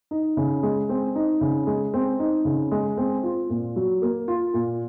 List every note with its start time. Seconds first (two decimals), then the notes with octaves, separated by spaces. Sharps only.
0.11 D#4
0.37 C#3
0.63 G#3
0.89 C4
1.15 D#4
1.41 C#3
1.67 G#3
1.94 C4
2.19 D#4
2.45 C#3
2.71 G#3
2.97 C4
3.23 F4
3.49 A#2
3.76 F#3
4.02 A#3
4.28 F4
4.54 A#2